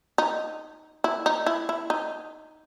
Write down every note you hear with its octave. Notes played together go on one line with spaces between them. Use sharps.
D#4
E4
D#4
E4
E4
D#4